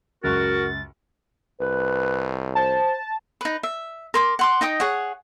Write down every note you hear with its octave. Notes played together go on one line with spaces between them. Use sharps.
C#2 F#2 F#4 A#4 A6
C2 B4
C5 A5
D#4 B4
E5
A#4 C6 D6
F#5 C6 D6
D#4 D#5 G5 D#6
G#4 C#5 F#5